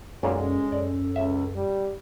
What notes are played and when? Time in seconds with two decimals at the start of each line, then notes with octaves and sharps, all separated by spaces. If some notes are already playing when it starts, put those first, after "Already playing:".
0.23 B1 F#2 A#2 G#3 C#4 A4
0.72 F#2 D5
1.16 C#2 E5
1.55 G3